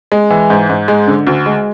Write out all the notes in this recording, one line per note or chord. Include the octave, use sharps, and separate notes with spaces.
G#3
E3
G#2
G#2
G#3
D3
D2
G#3